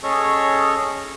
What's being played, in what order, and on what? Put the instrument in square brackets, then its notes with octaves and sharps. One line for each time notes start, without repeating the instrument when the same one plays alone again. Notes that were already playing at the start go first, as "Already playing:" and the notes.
[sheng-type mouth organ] C#4 G#4 A4 C#5 D#5 C#6